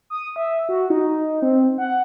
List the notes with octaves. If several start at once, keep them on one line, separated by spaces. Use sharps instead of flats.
D#6
E5
F#4
D#4
C4
F#5